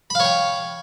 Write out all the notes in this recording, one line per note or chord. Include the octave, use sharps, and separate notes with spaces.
C#5 F5 G5 B5